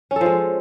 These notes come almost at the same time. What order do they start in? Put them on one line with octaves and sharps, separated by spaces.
C#4 A4 F3 G#3